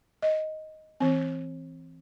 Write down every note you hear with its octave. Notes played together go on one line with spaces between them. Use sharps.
D#5
E3 C4